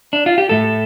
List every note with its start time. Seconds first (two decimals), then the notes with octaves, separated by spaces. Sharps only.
0.13 D4
0.26 F4
0.38 G4
0.49 A2 A3 A4